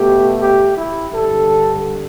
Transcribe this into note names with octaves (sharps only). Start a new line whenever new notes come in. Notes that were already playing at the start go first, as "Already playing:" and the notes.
Already playing: B2 A3 G4
G4
E4
G2 D3 G3 A4